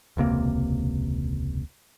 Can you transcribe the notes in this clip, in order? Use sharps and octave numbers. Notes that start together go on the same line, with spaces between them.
E1 C#2 C3 A#3